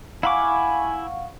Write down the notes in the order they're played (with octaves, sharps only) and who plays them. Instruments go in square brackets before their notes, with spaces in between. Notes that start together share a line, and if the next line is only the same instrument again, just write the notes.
[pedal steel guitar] E4 B5 D6 [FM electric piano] F5 F#5 C#6 [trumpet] G#5